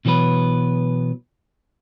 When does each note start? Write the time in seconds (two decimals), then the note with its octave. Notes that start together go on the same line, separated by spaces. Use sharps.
0.05 B2 E3 F#3 B3 B4